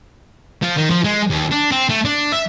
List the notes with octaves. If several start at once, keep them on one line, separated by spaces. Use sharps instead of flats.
F3
D#3
F3
G#3
D#2
D4
C4
A3
D4
E5